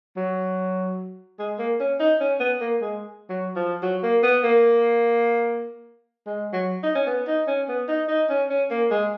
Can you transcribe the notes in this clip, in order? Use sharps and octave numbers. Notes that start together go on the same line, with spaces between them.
F#3
G#3
A#3
C#4
D#4
C#4
B3
A#3
G#3
F#3
F3
F#3
A#3
B3
A#3
G#3
F#3
D#4
C#4
B3
D#4
C#4
B3
D#4
D#4
C#4
C#4
A#3
G#3